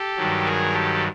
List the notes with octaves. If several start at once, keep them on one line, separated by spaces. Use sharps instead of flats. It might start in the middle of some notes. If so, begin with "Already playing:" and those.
Already playing: G4 A4
G2 D#3 F#3
G#4 A#4
G4 A4